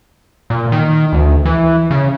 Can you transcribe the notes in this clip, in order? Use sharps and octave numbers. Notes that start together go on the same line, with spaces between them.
A#2
D#3
D2
E3
C#3